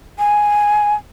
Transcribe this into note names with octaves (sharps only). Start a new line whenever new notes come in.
G#5